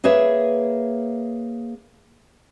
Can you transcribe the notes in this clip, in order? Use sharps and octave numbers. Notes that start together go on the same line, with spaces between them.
A#3 G#4 B4 C#5 E5